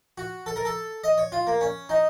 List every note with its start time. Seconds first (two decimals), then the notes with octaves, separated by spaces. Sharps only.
0.18 F#4
0.46 A4
0.56 A#4
0.65 A4
1.04 D#5
1.18 C#5
1.32 F4
1.47 A#3
1.61 C#4
1.89 D#4